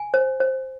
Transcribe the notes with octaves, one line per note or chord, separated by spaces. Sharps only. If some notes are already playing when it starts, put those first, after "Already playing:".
Already playing: G#5
C5
C5